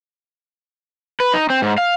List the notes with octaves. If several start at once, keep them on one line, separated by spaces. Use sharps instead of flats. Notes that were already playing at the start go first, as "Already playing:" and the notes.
B4
D#4
C4
G#2
F5